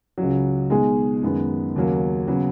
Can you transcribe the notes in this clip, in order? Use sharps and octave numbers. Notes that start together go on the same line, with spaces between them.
C#2 C#3 F#3
B2 G#3 D#4 G#4
F#2 D#3 G#3 B3
D#2 C#3 F#3 A#3
C#3 F#3 B3